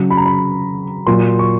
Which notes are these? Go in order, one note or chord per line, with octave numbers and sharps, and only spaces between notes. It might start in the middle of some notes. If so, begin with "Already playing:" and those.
Already playing: C#3 F#3
B5
A#5
B5
A#2 F#3 C6
C#6